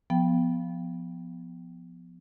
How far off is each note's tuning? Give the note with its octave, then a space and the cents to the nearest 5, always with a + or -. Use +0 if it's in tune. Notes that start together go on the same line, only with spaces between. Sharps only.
F3 +0 B3 +0 G5 +0